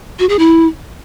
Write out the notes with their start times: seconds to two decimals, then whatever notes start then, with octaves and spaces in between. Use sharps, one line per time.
0.19 F#4
0.29 G#4
0.39 E4